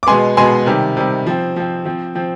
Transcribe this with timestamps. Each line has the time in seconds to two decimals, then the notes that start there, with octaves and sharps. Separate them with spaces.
0.03 D6
0.07 B2 G#3 B3 G#5 C6
0.37 B2 G#3 B3 G#5 C6
0.67 C3 D#3 G3
0.97 C3 D#3 G3
1.27 F3 C4
1.56 F3 C4
1.85 F3 C4
2.15 F3 C4